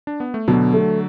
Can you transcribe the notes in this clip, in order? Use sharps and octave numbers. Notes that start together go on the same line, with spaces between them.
D4
B3
A3
B2 D3 F#3
A3